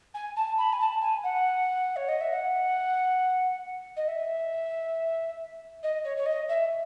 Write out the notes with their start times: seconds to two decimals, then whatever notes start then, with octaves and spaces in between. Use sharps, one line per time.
0.14 G#5
0.36 A5
0.58 B5
0.73 G#5
0.80 A5
1.02 G#5
1.24 F#5
1.96 C#5
2.08 D#5
2.21 E5
2.33 F#5
3.97 D#5
4.08 E5
5.83 D#5
6.04 C#5
6.17 C#5
6.26 D#5
6.49 E5